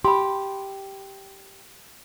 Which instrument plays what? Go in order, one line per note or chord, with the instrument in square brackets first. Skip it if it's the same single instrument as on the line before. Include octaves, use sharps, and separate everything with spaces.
[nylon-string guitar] G4 [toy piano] B5 C6